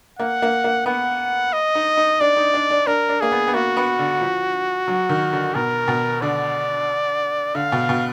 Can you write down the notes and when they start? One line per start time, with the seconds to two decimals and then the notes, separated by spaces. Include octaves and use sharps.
0.19 A#3 F#5
0.42 A#3
0.64 A#3
0.86 B3 F#5
1.53 D#5
1.75 D#4
1.97 D#4
2.20 D4 D5
2.37 D#4
2.54 D4
2.71 D4
2.87 D4 A#4
3.09 D4
3.21 A#3 G#4
3.32 B3
3.48 B3
3.54 A#3 F#4
3.77 B3
3.99 D3
4.21 F3
4.88 F#3
5.09 D#3
5.33 D3
5.55 B2 A#4
5.88 B2
6.21 D3 D5
7.55 D3 F5
7.72 B2
7.89 B2